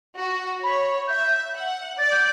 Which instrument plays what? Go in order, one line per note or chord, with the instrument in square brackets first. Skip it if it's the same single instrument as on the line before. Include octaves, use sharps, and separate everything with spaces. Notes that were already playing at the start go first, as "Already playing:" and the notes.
[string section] F#4
[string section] C#5 [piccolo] B5
[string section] E5 [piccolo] G6
[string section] F#5
[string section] D5 [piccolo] A6
[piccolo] G6